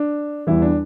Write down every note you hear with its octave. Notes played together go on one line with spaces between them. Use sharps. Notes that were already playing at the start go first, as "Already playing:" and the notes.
Already playing: D4
E2 E3 G3 E4
D4